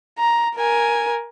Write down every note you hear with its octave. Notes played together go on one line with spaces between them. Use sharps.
A#5
A#4 G#5